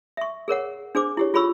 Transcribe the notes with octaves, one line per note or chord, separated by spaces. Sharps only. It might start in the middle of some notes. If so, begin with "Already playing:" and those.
E5 C#6
G#4 A#4 C#5 F#5
D4 G#4 C5 D6
E4 G4 C#5
F4 G#4 C#5 B5 C#6 E6